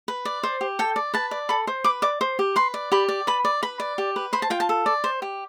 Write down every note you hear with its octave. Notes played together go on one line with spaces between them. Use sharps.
B4
D5
C5
G4
A4 G5
D5
B4 A5
D5
A4 B5
C5
B4 D6
D5 D6
C5
G4
B4 C6
D5
G4 B5
D5
B4 B5
D5
B4 B5
D5
G4
B4
C5 B5
A5
F4 G5
A5
A4
D5
C5
G4